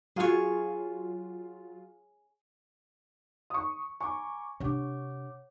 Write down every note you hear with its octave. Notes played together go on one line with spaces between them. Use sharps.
F#3 F4 G#4 C#5
C#6 D#6
G#5 A#5 C#6 D6
C3 D4 C#5 F#5 D6